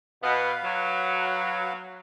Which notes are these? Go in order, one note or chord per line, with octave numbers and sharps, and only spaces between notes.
B2 B3 B4 F5
F#3